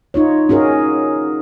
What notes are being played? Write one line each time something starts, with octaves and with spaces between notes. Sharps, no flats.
D#4 F4 C#5
C#4 F#4 G#4 A#4